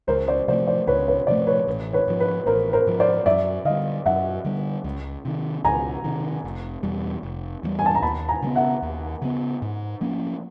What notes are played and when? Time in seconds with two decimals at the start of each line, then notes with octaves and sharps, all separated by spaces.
0.08 C#2 A#4 C5
0.28 C5 D5
0.48 C3 F3 A3 C5 D5
0.67 C5 D5
0.87 C#2 B4 C#5
1.08 B4 C#5
1.27 C3 F3 A3 C5 D5
1.47 B4 C#5
1.68 A1
1.93 B4 C#5
2.07 G#2 F3
2.20 B4
2.46 A1 A#4 C5
2.73 A#4 C5
2.87 G#2 F3
3.00 C5 D5
3.26 F#2 D5 E5
3.65 D3 G3 D#5 F5
4.05 F#2 E5 F#5
4.45 D3 G3
4.84 C#2
5.25 C3 D#3
5.64 C#2 G#5 A#5
6.04 C3 D#3
6.44 F1
6.83 E2 B2 G3
7.23 F1
7.63 E2 B2 G3
7.79 G#5
7.86 A5
7.95 A#5
8.02 D#2 A5 B5
8.29 G#5 A#5
8.42 C#3 F#3
8.47 B3
8.56 E5 F#5
8.82 D#2
9.22 C#3 F#3 B3
9.62 G#2
10.01 F3 A#3 C#4